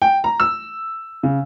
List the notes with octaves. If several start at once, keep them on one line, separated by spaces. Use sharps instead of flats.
G5
A#5
E6
C#3